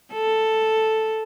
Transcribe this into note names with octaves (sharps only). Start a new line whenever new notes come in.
A4